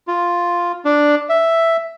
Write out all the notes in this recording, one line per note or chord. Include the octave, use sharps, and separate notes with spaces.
F4
D4
E5